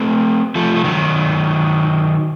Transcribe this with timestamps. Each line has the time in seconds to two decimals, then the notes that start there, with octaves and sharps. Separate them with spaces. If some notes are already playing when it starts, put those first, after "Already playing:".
Already playing: A3 C4
0.55 F3 A3
0.76 A3
0.84 D#3 F#3